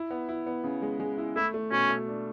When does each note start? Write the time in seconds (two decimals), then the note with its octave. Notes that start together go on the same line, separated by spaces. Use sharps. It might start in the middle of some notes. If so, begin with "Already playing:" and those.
Already playing: E4
0.10 B3
0.29 E4
0.46 B3
0.64 C#3
0.82 G#3
1.00 G#3
1.18 E4
1.36 A3 E4
1.54 A3
1.71 B2 C#4
1.89 A3
2.08 D4